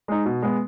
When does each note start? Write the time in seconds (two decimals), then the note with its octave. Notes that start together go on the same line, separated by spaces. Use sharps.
0.08 G#3 D#4
0.25 B2
0.42 G#3 B3